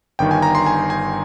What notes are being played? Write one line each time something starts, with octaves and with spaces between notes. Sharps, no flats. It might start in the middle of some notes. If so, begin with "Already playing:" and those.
G1 G2 D#3 G5
G#5
A#5
C6
G#5
G#5